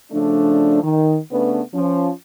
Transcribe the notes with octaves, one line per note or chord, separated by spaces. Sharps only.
C#3 F3 A3 D4
D#3
C#3 A3 B3 C#4 D4 B4
F3 C#4